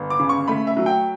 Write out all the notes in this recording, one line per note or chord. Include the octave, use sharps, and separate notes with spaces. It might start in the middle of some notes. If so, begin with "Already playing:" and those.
Already playing: G1
D6
C#3
C#6
A3 B5
E5
F#3
G5